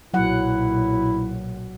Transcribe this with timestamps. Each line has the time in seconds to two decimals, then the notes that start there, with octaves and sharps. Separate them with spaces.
0.14 B1 A#2 F#3 E4 F#5